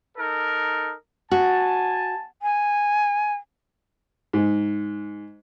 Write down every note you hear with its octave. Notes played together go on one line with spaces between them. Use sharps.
D#4 A4 A#4
F#4 G#5 A5
G#5
G#2